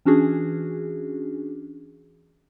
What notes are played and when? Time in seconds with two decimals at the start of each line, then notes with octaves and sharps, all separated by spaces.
0.05 E3 C#4 D4 F#4 G#4